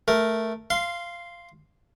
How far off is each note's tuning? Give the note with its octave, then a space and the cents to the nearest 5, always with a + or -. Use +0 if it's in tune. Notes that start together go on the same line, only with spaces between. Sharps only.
A3 +0 A#4 +0
F5 -15 C6 +0